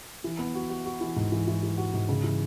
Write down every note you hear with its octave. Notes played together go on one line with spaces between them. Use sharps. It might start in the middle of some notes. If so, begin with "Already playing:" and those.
E3
B3
F#4
F#4
F#4
E3
G#2
E3
E3
E3
F#4
G#2
C#3
E3